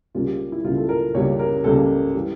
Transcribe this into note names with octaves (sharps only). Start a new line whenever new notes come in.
C#2 C#3 G3 A#3 F4
G4
E4
C#2 C#3 G3 A#3 F4
A4
A#4
C#2 C#3 G3 A#3 C#5
A#4
C#2 C#3 G3 A#3 A4
E3 G3